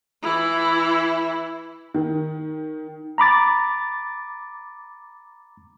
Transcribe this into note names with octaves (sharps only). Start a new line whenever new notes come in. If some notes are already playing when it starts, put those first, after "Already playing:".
E3 E4
D#3
A#5 B5 D6 A6